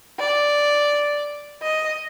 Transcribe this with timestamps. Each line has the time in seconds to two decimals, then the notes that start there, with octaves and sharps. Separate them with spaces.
0.19 D5
1.63 D#5